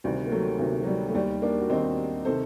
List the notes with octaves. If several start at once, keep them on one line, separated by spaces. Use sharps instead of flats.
D2 C3 D#3 G3
A#3
F#3 A3
D2 C3 D#3
F#3
G3
A3
D#2 D#3 G3
A#3 D4
F#4
D#2 D#3 C4 D#4
C3 D#3 A4 C5